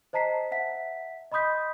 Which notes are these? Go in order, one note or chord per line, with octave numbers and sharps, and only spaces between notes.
C5 D#5 A5 A#5 B6 C7
E5 F#5 B6
D#5 B5 C6 D#6 G6 B6